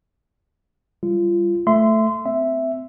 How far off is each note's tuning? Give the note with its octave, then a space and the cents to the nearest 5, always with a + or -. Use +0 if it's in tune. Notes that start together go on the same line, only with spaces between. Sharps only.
G3 +0 F4 -25
A3 +0 E5 +10 C6 -20
C4 -25 E5 +0